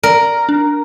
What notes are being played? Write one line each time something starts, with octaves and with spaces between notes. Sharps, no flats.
A#4 D5
D4